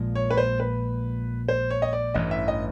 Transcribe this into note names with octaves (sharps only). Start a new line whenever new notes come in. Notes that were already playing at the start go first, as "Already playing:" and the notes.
Already playing: A#1 A#2 F3 G#3
C#5
B4
C5
B4
C5
C#5
D#5
D5
A1 G2 E3 D#5
E5
D#5